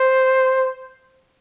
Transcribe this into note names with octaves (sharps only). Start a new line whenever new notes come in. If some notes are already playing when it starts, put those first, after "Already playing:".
Already playing: C5